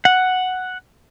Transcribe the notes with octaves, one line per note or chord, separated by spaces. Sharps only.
F#5